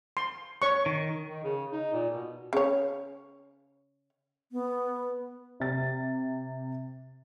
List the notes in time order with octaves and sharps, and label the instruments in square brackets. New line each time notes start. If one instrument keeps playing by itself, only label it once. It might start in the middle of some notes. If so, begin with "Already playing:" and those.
[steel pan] C6
C#5 C#6
[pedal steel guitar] D#3
[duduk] D#3
C#3
D#4
A#2
B2
[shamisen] C#3 C#5
[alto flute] B3
[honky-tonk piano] C3 G4 A6